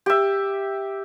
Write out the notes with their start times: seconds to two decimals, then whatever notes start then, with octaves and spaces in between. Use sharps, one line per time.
0.06 G4 E5